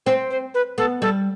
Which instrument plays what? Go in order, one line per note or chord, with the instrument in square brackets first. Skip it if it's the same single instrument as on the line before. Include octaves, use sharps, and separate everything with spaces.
[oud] C4 [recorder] C5
[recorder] C5
B4
[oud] B3 [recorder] A4
[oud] G3 [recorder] A4